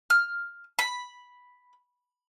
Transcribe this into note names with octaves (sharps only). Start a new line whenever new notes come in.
F6
B5